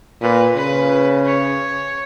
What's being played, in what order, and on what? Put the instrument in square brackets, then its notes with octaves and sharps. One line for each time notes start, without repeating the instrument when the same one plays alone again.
[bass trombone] A#2 [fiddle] B4
[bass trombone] C#3 [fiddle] B4
[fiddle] C#5